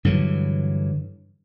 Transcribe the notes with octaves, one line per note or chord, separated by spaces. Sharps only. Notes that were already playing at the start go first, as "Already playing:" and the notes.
G2 D3 E3 F#3